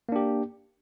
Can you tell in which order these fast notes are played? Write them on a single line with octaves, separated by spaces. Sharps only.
A#3 D4 G4